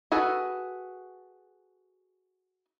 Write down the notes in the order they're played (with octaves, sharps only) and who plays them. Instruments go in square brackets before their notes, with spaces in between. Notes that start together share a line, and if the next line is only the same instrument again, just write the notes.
[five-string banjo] F#4 G#4 A4 B4